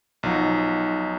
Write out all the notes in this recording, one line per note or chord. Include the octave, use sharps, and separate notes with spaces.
B1 F3 D#4 F#5